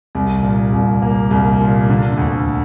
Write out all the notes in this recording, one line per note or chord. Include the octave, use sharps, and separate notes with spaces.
C2
A#2
C2
A#3
C2
A#2
D3
D2